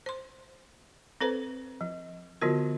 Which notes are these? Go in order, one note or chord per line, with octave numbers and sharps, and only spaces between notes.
C5 C6
C4 A4 B4 C5
F3
D3 F3 B3 F4 F#4 A#4